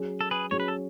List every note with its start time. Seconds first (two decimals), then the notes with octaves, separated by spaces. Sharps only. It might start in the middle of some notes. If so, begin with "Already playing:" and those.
Already playing: F#3 C#4 G#4
0.21 A4
0.31 G#4 B4
0.51 F#3 C#4 G#4 C#5
0.60 B4
0.68 A4